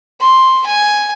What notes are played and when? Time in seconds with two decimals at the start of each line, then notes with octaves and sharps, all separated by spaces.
0.20 C6
0.66 G#5